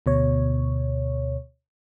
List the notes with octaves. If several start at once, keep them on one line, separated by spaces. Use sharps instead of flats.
D2 B2 C#5